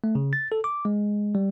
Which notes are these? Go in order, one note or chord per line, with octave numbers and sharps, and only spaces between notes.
A3
C#3
A6
A4
D6
G#3
G3